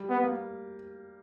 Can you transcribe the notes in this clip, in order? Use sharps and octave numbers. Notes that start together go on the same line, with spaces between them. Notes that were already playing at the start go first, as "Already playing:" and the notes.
Already playing: G3
B3
A#3